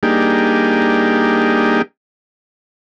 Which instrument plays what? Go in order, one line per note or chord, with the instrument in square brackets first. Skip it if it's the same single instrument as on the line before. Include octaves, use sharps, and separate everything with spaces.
[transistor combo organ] G3 A#3 D4 D#4 G4 G#4